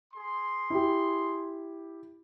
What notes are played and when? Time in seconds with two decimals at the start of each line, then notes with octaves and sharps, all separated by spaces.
0.13 G#4 C6
0.70 E4 G4